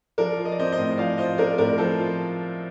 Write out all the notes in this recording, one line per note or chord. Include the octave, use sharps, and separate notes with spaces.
F3 A#4 D5
F4
D#5
D5
C4 C5 D#5
C5 D#5
A2
F3 D5 F5
F4 C5 D#5
C4 A#4 D5
A2 A#4 D5
F3 A4 C5
F4